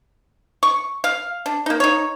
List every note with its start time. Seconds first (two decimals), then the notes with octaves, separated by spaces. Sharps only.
0.63 C#6
1.04 F5
1.46 D4
1.66 A#3 D#4
1.80 D#4 C#5